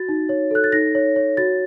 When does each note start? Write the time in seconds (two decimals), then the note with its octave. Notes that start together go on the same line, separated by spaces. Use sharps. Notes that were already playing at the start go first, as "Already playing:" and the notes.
Already playing: F#4 A6
0.09 D#4
0.29 C#5
0.51 A4 F#6
0.64 A6
0.72 D#4 A#6
0.95 C#5
1.16 C#5
1.37 F#4 A6